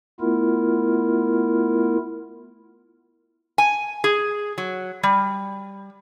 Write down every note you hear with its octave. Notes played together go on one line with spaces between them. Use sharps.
A3 B3 E4 F4 A#4
G#5
G#4
F#3
G3